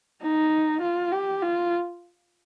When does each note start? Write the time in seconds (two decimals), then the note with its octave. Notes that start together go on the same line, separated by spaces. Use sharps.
0.22 D#4
0.81 F4
1.12 G4
1.42 F4